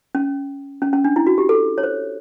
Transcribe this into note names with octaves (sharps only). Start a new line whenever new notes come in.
C#4
C#4
C#4
D4
E4
F#4
G4
A4
C#5
C5